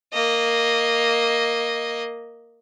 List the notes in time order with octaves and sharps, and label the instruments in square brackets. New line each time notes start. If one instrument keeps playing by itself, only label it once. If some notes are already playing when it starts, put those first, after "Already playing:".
[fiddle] A#3 D#5